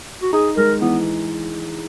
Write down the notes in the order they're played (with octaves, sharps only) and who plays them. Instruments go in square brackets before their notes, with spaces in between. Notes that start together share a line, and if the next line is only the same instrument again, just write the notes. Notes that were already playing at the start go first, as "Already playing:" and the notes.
[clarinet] F#4
[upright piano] D#4 [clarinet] G#4
[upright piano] G#3 [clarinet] A#4
[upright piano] E3 [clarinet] B3